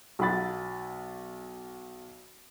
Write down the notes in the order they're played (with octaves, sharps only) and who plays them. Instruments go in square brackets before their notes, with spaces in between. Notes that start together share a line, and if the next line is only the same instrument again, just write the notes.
[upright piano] B1 F#5 B5 A6